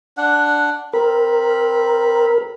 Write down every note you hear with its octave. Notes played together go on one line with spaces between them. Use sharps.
D4 F#5
C4 A#4 B5